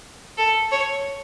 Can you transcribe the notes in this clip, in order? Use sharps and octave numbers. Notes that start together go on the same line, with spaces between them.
A4
C#5